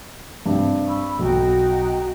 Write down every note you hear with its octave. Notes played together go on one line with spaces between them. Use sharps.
G2 C3
B5 C#6 E6
B1 D#4 F#4 G5